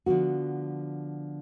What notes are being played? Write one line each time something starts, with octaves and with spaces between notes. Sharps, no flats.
D3 F3 B3 F#4